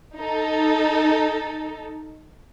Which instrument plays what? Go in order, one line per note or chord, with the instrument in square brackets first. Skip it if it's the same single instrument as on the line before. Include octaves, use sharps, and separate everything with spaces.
[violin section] D#4 A4